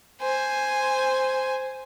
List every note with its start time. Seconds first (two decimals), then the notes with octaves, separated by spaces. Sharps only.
0.21 C5 G#5